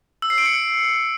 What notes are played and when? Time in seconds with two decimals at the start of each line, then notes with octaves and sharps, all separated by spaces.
0.22 E6
0.30 C7
0.38 D7
0.46 C#7